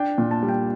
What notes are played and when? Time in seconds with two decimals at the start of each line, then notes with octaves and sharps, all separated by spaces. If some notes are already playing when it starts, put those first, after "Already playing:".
Already playing: D4 G5
0.18 A#2
0.31 A5
0.43 G3
0.49 G5